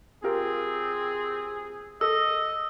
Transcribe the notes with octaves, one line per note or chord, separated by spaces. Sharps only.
C4 F4 G4 G#4 A#4
A4 D#5 E6